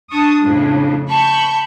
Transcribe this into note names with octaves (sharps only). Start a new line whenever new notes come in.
D4 A5 C#6 D#6
F2 A2 C#3
A5 B5 C#6 G6